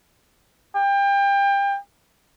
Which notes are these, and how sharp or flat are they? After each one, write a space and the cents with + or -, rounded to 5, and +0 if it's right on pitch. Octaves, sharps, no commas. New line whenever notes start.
G5 +30